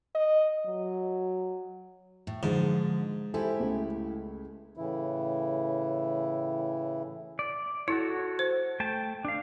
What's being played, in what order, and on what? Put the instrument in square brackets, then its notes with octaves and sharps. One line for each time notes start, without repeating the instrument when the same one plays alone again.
[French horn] D#5
F#3
[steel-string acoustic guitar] A2
[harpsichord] G#2 [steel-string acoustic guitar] D3 F3 G#3
[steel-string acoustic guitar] E4 G4 [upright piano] A4 C5 G#5
[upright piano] C#2 A3
[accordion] A2 C#3 E3 E4
[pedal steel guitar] D5
[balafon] E4 [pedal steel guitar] F#4 A4 C#5
[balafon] C5
[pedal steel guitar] A3 G5 A5
D4 F5